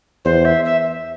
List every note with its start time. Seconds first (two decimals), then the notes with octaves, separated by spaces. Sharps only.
0.25 E2 C5
0.45 E5
0.65 E5